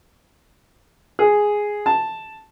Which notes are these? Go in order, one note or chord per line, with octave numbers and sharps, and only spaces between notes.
G#4
A5